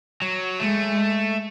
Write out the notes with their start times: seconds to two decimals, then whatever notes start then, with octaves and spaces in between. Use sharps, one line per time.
0.22 F#3
0.60 G#3 A3